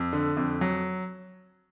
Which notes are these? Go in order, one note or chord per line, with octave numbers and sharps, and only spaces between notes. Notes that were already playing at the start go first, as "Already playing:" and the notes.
Already playing: F2
D3
F2
F#3